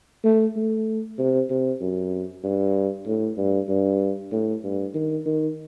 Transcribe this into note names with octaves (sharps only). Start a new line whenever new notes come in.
A3
A3
C3
C3
F#2
G2
A2
G2
G2
A2
G2
D#3
D#3